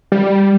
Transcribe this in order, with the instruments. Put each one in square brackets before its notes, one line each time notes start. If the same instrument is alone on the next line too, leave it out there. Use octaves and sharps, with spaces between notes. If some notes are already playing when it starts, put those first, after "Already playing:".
[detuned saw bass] G3